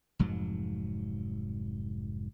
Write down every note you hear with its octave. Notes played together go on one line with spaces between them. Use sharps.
F1 F2 G#2 F#3